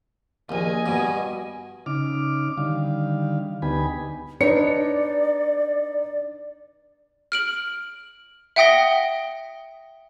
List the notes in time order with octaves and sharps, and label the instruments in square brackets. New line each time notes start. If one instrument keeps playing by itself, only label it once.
[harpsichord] A#1 D#2 [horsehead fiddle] D#5 G#5
[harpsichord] G2 B2
[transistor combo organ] C#3 D#4 D6 F6
D3 D#3 G3 F5
D2 B3 D#4 G4 G#5 B5
[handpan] D4 B4 [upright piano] D#4 C#7 [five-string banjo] C#5 [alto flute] D5
[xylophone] F6 D7 F#7
E5 F#5 G5 D#6 A#6 G7